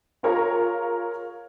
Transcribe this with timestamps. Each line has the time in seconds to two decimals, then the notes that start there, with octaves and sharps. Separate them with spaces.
0.23 F4 G#4 A#4 C#5 F5 A#5